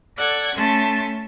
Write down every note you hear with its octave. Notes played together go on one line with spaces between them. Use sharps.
A4 D5 F#5 E6 G#6
A3 C#4 A5 C6